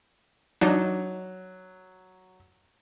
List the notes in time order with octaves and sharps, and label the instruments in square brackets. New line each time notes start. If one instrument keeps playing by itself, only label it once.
[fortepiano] F#3 [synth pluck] D4 D#4